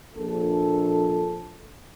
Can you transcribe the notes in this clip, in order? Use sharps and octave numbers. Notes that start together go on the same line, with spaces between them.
A#1 A4